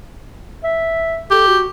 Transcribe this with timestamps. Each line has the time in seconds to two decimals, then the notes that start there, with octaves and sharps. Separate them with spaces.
0.64 E5
1.31 G4 A4
1.48 F#4